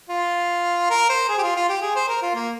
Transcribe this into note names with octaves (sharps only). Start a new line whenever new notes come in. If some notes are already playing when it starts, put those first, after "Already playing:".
F4
A#4
C5
G#4
G4
F4
F4
G4
G#4
C5
A#4
F4
A#3